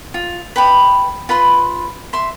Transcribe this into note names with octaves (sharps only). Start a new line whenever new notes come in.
F4
B4 G5 B5
F4 B4 B5 C6
E5 C6